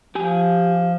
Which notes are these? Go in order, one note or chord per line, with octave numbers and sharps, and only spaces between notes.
F3 G4 G#5